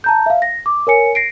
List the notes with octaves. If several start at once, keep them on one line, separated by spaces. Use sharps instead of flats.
A5 A#5 G6
E5 F5
A#6
D6
A#4 C#5 G#5 C#7
A#6 C7 D7